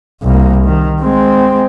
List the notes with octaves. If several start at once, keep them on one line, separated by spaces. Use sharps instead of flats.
C2 A#3
D#3
G#3 C4